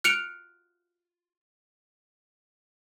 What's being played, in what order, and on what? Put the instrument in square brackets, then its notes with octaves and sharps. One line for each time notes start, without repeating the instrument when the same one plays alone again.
[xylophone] F6 F#6 C#7 D7 F7